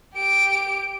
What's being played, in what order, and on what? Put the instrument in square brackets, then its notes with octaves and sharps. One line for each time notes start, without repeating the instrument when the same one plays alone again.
[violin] G4 D7